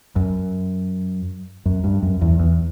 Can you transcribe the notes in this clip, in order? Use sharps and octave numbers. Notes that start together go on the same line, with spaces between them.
F#2
F#2
G2
F#2
E2
E2